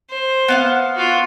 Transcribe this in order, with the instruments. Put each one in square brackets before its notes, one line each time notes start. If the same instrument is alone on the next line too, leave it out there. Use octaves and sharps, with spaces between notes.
[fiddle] C5
[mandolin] B3 F5 F#5
[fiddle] F4 F#4